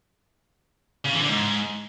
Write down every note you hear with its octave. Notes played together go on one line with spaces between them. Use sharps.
C#3
E3
D3
G#2